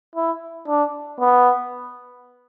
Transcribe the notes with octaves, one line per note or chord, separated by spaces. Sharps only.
E4
D4
B3